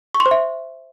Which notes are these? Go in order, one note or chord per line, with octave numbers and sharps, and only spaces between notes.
C#6
C6
C5
E5